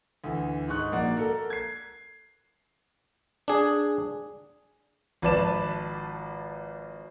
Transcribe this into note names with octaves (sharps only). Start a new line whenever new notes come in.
D2 E3
G#2 D#3 D#4 C#6 F#6
A#1 A#3 F#4 D5 F#5
A4 A#4
G#6 C7
D4 G#4
G#1 F3 B4 D5 A5 E7